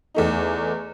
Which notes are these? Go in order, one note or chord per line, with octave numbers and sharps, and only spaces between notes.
E2 A3 D#4